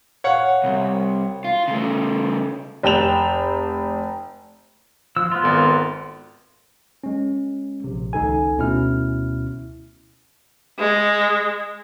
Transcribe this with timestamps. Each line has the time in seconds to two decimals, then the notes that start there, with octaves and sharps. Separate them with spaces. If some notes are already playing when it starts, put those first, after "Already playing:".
0.24 C#5 F5 F#5
0.64 C2
1.45 F4
1.68 C#3 A3
2.83 F1 G5 E7 F7
5.17 F3 E6
5.32 B3 F4
5.44 G#1 A4
7.04 G#3 C#4
7.84 A#1 C3
8.13 G#1 C#2 D#4 A4 G#5
8.58 D2 B2 C#4 E4 F6
10.79 G#3